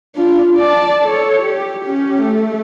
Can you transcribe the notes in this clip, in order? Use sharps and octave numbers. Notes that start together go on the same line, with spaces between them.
D4 F4
D5 A5
A4 C#5
G4
C#4 G4
A3